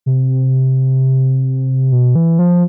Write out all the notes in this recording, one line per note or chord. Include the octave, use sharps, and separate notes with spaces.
C3
B2
E3
F3